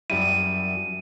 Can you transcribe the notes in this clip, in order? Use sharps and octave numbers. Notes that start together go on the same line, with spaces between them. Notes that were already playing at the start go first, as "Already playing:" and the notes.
F#2 G3 E4 D#7